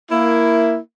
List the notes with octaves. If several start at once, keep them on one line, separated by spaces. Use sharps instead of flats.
A#3 E4